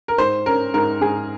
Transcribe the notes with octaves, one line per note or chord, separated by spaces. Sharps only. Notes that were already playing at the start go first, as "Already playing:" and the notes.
A#4
G#2 C5
C#4 A#4
G#2 A#4
G#2 G#4